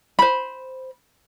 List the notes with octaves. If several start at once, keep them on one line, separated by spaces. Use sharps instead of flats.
C5 B5